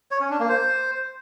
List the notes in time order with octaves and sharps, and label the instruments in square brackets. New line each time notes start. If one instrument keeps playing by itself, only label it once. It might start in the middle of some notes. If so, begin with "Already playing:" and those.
[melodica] C#5
C#4
D4
A#3
C5